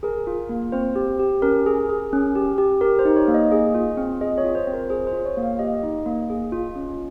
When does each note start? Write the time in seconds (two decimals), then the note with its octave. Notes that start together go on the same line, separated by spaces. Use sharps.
0.03 G#4 A#4
0.27 F4
0.49 A#3
0.72 C4 C5
0.96 G4
1.19 G4
1.42 C#4 A#4
1.66 G#4
1.89 G#4
2.13 C#4
2.35 G4
2.58 G4
2.81 G4 A#4
2.99 C5
3.05 D#4
3.16 C#5
3.28 A#3
3.34 D#5
3.51 G#4 D#5
3.74 F4
3.97 C4
4.21 G#4 D#5
4.38 C#5
4.44 F4
4.55 C5
4.67 C4
4.73 A#4
4.90 G#4 C5
5.07 C5
5.13 F4
5.26 C#5
5.37 A#3
5.43 F5
5.59 G4 D#5
5.83 D#4
6.06 A#3
6.30 G#4
6.52 F4
6.76 C#4